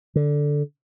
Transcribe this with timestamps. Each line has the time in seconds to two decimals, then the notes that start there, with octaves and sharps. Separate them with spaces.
0.16 D3